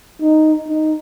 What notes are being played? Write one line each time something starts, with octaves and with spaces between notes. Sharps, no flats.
D#4
D#4